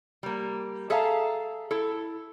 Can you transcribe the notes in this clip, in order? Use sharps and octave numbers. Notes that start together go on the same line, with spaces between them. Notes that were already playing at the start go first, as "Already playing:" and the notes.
G3 A#3
G#4 A4 E5 F5 A5 A#5
E4 A4